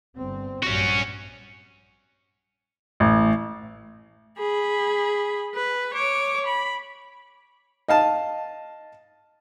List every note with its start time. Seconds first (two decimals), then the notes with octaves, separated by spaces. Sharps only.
0.15 G1 C4
0.63 A#1 G2 C#4 F#4
3.00 A1
4.38 G#4 B5
5.55 B4
5.94 C#5 D6
6.47 B5
7.88 D#5 F5 A5